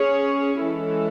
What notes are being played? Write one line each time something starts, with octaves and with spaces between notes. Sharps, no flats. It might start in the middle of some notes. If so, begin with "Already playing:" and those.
Already playing: C#4 G#4 C#5
E3 G#3 C#4 E4 A4